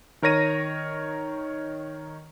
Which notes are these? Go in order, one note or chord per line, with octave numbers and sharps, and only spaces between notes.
D#3 A#4 C#5 A#6 D#7